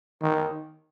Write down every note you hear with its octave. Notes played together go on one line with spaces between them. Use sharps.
D#3